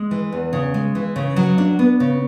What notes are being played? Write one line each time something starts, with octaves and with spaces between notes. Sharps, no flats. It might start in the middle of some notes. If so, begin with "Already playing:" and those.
Already playing: G#3
E3
E2
C#3
G#3
E3
C#3
F#3
D4
B3
C#3